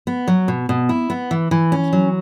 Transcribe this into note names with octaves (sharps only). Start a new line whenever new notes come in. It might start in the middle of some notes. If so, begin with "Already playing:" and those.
B3
F#3
B2
B2
E4
B3
E3
E3
C#4
F#3